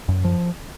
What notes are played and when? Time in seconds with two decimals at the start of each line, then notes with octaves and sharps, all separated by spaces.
0.09 F#2
0.24 F3